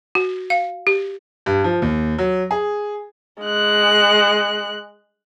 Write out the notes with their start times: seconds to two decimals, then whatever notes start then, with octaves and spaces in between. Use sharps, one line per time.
0.15 F#4
0.50 F5
0.87 G4
1.46 G2
1.64 F3
1.82 D#2
2.18 F#3
2.51 G#4
3.42 G#3 F#6